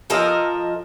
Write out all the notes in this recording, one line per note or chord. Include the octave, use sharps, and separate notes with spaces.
F3 A4 A#4 D#5